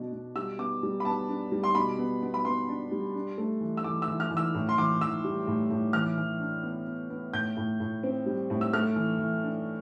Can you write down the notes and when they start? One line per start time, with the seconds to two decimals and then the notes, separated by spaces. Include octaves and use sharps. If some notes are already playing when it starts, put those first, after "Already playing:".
Already playing: B2 D4
0.12 B2
0.36 G3 E6
0.59 B3 D6
0.83 G3
1.00 B5
1.05 B3 A5
1.29 D4
1.52 G3
1.64 C6
1.75 B2 B5
1.98 B3
2.22 B3
2.34 B5
2.45 B3 C6
2.68 D4
2.92 G3
3.15 D4
3.38 A3
3.61 E3
3.77 E6
3.84 E3 D6
4.02 E6
4.08 E3
4.20 F6
4.31 E3
4.37 E6
4.55 A2
4.69 C6
4.78 E3 D6
5.01 E3 E6
5.24 G3
5.48 A2
5.70 A2
5.93 E3 F6
6.18 E3
6.40 D4
6.63 B3
6.87 B3
7.10 B3
7.33 A2 G6
7.57 A2
7.80 A2
8.03 C4
8.26 G3
8.50 A2
8.61 E6
8.73 A3 F6
8.96 E3
9.19 E3
9.43 D4